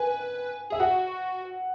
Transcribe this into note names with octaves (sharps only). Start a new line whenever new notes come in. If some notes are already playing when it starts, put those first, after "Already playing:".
Already playing: B4 G#5
G#4 E5
F#4 F#5